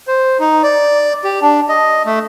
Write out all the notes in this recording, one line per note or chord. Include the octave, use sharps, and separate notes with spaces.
C5
D#4
D5
G4
D4
D#5
A3